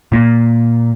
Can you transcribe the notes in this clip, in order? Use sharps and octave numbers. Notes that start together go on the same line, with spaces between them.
A#2 A#3